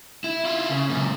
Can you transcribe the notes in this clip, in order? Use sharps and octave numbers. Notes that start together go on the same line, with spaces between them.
E4
E4 F4
C#3
F#2 A#2